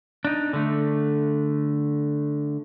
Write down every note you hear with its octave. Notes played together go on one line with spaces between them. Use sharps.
D4 D#4
D3 A3